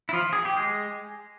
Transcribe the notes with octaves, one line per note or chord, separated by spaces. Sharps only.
E4
F3 F4
G#4
G4
G#3 G#4